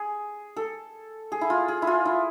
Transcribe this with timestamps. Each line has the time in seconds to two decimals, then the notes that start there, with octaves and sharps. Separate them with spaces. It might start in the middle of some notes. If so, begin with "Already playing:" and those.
Already playing: G#4
0.57 A4
1.32 G#4
1.41 E4
1.50 F4
1.68 G#4
1.82 E4
1.87 F4
2.05 E4